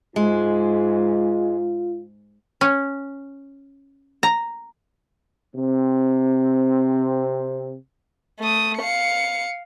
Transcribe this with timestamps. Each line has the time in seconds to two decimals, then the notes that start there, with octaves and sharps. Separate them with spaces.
0.16 G#2 G#3 F4
2.61 C#4
4.23 A#5
5.55 C3 C4
8.39 A3 D#6
8.78 F5 C#7